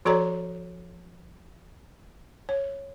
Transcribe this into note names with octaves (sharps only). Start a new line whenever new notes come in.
F3 F#4 A4 C#5 D5 A#5
C#5